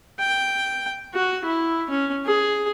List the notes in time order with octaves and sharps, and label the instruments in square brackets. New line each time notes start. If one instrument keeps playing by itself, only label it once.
[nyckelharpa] G5
F#4
E4
C#4
G#4